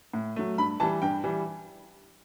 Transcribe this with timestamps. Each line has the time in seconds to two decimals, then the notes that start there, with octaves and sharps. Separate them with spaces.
0.14 A2
0.36 F#3 A3
0.58 G2 B5
0.80 E3 G3 A5
1.02 G2 G5
1.24 E3 G3